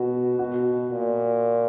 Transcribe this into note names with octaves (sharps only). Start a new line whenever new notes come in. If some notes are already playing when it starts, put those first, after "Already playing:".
Already playing: B2 F#4
B2 F#4
A#2